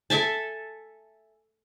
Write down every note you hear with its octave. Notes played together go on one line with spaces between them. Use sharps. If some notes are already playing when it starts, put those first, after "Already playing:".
A4 E5 G#5 A5